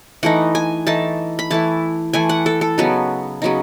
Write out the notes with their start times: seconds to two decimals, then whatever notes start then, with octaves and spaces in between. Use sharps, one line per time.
0.23 E3 A3 D#4 F#5
0.55 G#5
0.87 E3 A3 D#4 A5
1.39 B5
1.50 E3 A3 E4 A5
2.13 E3 A3 E4 G#5
2.29 F#5
2.46 A4
2.61 A4
2.78 C#3 F#3 B3 D#4
3.42 C#3 F#3 B3 D#4